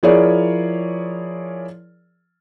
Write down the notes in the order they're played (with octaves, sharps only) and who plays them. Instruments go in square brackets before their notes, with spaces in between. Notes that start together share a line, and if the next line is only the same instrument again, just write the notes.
[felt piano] F3 E4 G#4 A#4 C#5 D5